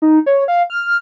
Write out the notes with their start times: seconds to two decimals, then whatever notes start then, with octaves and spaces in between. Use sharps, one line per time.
0.02 D#4
0.26 C#5
0.48 F5
0.70 F6